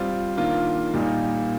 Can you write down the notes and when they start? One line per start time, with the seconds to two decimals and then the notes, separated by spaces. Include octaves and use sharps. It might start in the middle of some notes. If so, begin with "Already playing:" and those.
Already playing: G3 C4 F4
0.37 D#3 A#3 D4 F4
0.94 A#2 G3 A#3 D#4